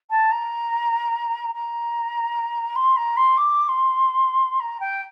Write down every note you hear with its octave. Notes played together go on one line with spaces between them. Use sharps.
A5
A#5
A#5
C6
A#5
C6
D6
C6
A#5
G5